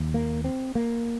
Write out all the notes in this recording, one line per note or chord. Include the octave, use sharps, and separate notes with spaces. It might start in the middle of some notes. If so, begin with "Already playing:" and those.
Already playing: D#2
A#3
C4
A#3